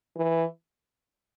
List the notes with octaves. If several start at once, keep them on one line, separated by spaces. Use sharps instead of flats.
E3